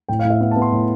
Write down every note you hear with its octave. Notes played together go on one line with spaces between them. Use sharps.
A2 G5
F5
A2
E5
B3 F5
A5
B3
C6
A2